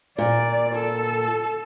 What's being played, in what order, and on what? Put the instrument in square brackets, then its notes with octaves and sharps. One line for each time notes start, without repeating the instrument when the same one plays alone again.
[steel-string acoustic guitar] A#2 [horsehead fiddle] D5
[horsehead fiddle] A4